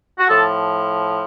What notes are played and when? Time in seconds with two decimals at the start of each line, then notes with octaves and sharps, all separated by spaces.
0.19 F#4
0.29 A2 F3 A4